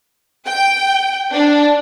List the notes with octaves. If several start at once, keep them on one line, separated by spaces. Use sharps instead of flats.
G5
D4